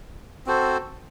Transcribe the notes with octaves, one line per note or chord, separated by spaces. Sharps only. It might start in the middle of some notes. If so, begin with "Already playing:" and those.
C4 F#4 A4 C5